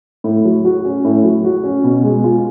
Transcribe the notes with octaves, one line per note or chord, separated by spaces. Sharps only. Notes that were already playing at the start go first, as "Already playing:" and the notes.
A2
F#3
F#4
C#4
A2
F#3
F#4
C#4
B2
G#3
F4